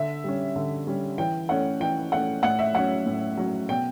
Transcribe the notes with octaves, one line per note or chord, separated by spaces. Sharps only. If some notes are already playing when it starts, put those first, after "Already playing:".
Already playing: D3 E5
G3 C#4
D3
G3 C#4
E3 G5
A3 C#4 F#5
E3 G5
A3 C#4 F#5
A2 F#5
E5
F#3 C#4 F#5
A2
F#3 C#4
B2 G5